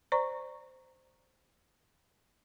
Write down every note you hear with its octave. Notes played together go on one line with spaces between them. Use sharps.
C5 D5 A#5 C#6